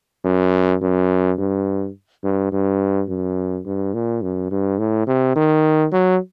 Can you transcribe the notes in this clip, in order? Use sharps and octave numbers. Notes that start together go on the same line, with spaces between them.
F#2
F#2
G2
G2
G2
F#2
G2
A#2
F#2
G2
A2
C3
D#3
F#3